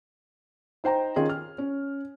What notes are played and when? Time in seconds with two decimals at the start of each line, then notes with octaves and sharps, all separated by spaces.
0.84 D#4 C5 G5 A#5
1.16 D#3 C#4 F4 G#4
1.29 F6
1.58 C#4